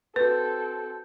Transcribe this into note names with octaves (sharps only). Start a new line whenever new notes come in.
C4 F#4 A4 B4 G6